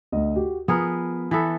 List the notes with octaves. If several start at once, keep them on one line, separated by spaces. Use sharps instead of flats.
D2 D#5
F#4 G4
F3 B3 G#4 A#4 B5
E3 B3 A4 B6